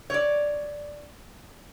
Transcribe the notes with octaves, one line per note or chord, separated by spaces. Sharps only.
C#5 D5